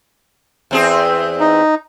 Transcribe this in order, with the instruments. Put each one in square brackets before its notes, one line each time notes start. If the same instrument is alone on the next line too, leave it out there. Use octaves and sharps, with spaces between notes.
[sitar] E2 C4 G#4
[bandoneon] D#4